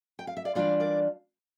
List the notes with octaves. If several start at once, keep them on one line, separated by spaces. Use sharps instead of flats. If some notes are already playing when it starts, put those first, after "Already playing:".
G5
F5
E5
D5 F5
E3 G3 D4 F4 D5 F5
A#4 D5